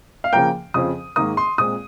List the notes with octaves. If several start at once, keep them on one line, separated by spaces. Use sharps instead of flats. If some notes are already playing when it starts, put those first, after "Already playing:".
F5
C#3 F3 A#3 G5
F2 C#3 F3 C4 D#6
G#2 D#3 A#3 D#6
C6
A#2 G#3 C4 D#6